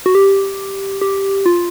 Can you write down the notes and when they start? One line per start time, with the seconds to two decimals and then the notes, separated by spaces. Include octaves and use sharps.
0.06 F#4
0.15 G4
1.01 G4
1.46 F4